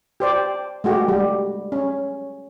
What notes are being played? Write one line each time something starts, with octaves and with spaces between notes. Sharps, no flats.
G4 C5 D5
G#3 A3 F#4 G4
G3
C#4